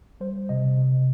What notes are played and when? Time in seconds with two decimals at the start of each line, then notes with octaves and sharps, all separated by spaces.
0.21 G3 C5
0.49 C3 D#5
0.77 C3